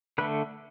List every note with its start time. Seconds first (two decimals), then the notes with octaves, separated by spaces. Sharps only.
0.18 D3 A3 B4